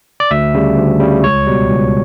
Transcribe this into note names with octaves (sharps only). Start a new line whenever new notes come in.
D5
D2 E5
C#3 G3
D2
C#3 G3
C#2 C#5
B2 G3
C#2